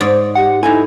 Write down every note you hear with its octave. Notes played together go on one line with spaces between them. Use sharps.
G#2 C#5 D5
G4 F#5
D#4 E4 A4 E5 G#5